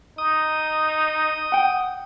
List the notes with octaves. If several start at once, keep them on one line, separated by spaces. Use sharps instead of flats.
D#4 D#6
F#5 G5